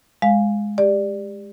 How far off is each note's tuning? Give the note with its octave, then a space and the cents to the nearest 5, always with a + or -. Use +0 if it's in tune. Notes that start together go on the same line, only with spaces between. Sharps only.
G#3 +0 F5 +5
G4 +25 D5 +10